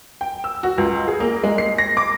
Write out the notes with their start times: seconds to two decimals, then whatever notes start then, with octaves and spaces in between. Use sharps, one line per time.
0.21 G5
0.44 E6
0.63 F#4
0.78 C#2
1.07 G#4
1.20 A#3
1.44 G#3
1.58 C7
1.78 A#6
1.97 D6